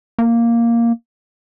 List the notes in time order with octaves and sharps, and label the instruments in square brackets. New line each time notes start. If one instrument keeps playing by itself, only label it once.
[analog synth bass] A#3